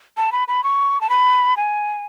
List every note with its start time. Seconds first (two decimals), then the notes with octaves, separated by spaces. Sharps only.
0.17 A5
0.32 B5
0.48 B5
0.63 C#6
1.01 A5
1.09 B5
1.57 G#5